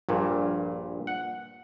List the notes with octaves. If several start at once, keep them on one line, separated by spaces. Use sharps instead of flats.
A#1 G2 A#2
F#5